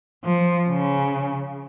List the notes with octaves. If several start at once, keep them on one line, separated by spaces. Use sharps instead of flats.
F3
C#3